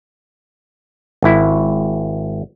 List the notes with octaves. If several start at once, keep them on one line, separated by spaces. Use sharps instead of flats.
G#1 E4